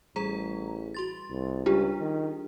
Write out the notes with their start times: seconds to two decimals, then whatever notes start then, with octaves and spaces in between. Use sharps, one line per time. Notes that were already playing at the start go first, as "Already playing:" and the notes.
0.16 A1 G3 G#4 A#5
0.95 F#4 C6 A6
1.30 C2
1.66 C#2 G3 D4 F4 G4 G#4
2.01 D#3